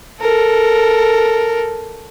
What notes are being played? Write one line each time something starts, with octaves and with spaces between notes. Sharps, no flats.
A4 A#4